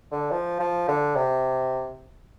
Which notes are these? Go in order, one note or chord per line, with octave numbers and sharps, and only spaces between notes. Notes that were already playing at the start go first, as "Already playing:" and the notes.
D3
F3
F3
D3
C3